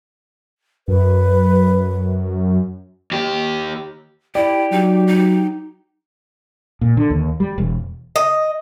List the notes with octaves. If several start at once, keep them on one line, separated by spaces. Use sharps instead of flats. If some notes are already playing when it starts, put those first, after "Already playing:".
F#2 B4
D#2 G4
E4 G4 D5
F#3 D#4
D#4
A#2
D3
D#2
G3
E1
D#5